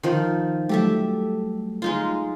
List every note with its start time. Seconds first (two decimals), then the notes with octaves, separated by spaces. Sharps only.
0.03 D#3 F3
0.69 F#3 G3 A3 G4 A4 E5
1.82 G#3 D#4 F4